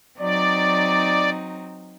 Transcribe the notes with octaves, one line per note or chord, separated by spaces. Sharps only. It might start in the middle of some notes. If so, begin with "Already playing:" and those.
F#3 C4 D#4 D5